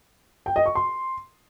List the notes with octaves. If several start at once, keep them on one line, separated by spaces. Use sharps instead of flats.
G5
D#5
C#6
C6